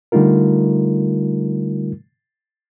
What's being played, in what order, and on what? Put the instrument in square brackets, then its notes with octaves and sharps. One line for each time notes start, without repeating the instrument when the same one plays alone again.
[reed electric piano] D3 G3 A3 D#4 F4 A#4